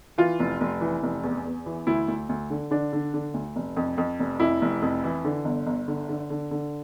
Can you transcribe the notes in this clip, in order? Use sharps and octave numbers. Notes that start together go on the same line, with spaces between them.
E3 F4
F1
F1
E3
F1
E2
E2
E3
D2 E4
D2
D2
D3
D3 D4
D3
D3
D2
F1
F2
F2
F1
F2 E4
F1
F2
E3
D3
G1
G1
D3
D3
D3
D3